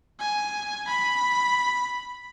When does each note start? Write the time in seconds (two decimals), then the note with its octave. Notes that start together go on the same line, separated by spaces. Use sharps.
0.20 G#5
0.88 B5